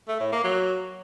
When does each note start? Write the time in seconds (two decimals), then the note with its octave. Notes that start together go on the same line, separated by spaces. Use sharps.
0.08 A3
0.20 A2
0.32 A#3
0.44 F#3